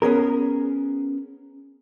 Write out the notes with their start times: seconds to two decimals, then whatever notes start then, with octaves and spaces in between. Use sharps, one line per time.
0.02 B3 C#4 G#4 A#4